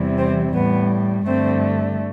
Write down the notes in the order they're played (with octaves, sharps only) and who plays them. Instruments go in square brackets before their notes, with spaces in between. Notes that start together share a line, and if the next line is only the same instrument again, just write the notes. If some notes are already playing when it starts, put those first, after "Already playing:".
Already playing: [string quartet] E2 C3 E3 G3
C4
A2 G3 B3
G2 D3 A3 C4